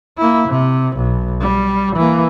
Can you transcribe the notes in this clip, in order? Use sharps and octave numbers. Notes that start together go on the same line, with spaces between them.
A#3 E4
C3
B1
G3
E3 A#3